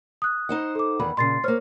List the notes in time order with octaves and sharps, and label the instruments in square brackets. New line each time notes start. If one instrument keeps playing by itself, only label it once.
[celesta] D#6 F#6
[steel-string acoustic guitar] D#4 C5 F#5
[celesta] A4 D6
[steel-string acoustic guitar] E2 D#3 F#5 [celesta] B5
[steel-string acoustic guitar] A#2 C#3 [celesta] C6 A6 C7
[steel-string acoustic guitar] A#3 C#5 [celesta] C5 F6